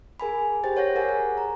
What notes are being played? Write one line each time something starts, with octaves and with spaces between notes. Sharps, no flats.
G#4 A#4 G#5 B5
G4 C5 G5 A6
C#5 F#5 G6 A#6
G#4 A#4 F#5 G#5
A#4
A#5